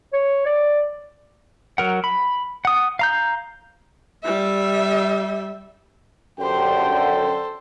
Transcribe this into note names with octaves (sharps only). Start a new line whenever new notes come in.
C#5
D5
F#3 A#4 F#5
B5
F#5 D#6
F5 A#5 G6
G3 E5
F#2 D3 G4 C5 G5
A4 C5